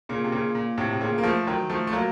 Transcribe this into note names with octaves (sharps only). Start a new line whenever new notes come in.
A#2 C#3
C3
A#2 C#3
A#2
A2 C3
C3
A#2 C#3
A#3
F3 A3
D#3 F#3
F3 A3
A3
F#3 A#3